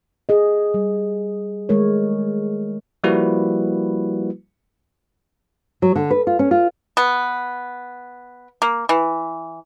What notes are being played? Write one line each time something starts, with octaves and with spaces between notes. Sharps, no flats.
G#4 D#5
G3
D#3 G#3 A3 A#4 C#5
F3 G3 A#3 E4 F#4 B4
F#3
D3
B4
F4
C#4
F4
B3
A#3
E3